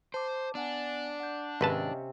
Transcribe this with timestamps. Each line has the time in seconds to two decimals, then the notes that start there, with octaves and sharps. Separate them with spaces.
0.14 C5 A5 D6
0.55 B3 D4 F#5 G#5
1.20 F#5 G6
1.61 G#1 C3 C#4 B4 D#5 F5 G5 A5